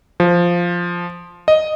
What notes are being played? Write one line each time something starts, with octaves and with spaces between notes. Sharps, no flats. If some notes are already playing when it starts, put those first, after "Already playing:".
F3
D#5